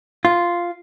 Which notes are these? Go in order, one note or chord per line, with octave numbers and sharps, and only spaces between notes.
F4